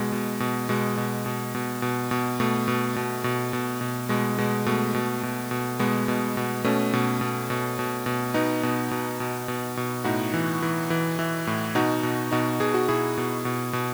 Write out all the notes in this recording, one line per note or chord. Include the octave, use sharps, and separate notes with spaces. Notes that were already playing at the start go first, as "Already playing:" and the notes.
Already playing: B2 G#3
B2
B2
B2 G#3
B2
B2
B2
B2
B2
B2 A3
B2
B2
B2
B2
B2
B2 G#3
B2 G#3
B2 A3
B2
B2
B2
B2 G#3 B3
B2
B2
B2 A3 C#4
B2
B2
B2
B2
B2
B2 B3 D#4
B2
B2
B2
B2
B2
A2 D#4 F#4
E3
E3
E3
E3
A2
B2 D#4 F#4
B2
B2 D#4 F#4
B2 G#4
F#4
B2 E4 G#4
B2
B2
B2